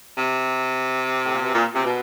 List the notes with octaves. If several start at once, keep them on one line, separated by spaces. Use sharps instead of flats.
C3
A2
A#2
B2
A#2
C3
B2